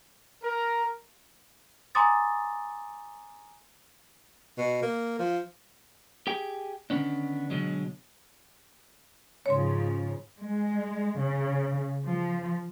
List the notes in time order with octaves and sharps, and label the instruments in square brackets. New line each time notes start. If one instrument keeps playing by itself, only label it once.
[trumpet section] A#4
[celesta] G#5 A#5 C6 D6 D#6 A6
[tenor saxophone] B2
A#3
F3
[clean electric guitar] G4 G#4 G5
D3 D#3 B3 C#4 D4
B2 D3 F#3 G#3
[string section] G#2 C#3 F3 [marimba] C#5 C6
[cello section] G#3
C#3
F3